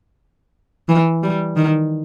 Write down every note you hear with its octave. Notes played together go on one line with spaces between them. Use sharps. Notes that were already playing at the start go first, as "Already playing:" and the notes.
E3
G3
D#3